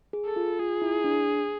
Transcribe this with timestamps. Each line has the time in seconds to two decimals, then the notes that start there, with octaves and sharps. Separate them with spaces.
0.13 G#4
0.26 A4
0.36 F4
0.59 F4 G#4
0.82 E4
1.04 D4